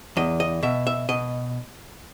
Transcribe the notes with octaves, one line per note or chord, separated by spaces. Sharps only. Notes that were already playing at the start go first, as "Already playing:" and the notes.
E2 D#5
D#5
B2 E5
E5
B2 D#5